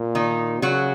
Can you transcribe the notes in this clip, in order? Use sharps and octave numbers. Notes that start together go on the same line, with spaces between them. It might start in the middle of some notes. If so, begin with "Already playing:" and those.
Already playing: A#2
D#3 D#4
C#3 F#3 F#4